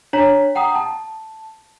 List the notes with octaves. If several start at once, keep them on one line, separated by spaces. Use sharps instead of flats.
D4 C#5 A#5 B6
F#5 G5 A#5 D#6
A5